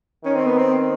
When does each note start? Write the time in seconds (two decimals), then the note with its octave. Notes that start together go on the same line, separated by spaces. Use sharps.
0.25 D#3 C#4
0.36 C4
0.46 B3
0.58 C4